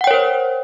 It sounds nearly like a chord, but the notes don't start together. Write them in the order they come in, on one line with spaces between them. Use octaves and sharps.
F#5 G5 C#5 A#4 C5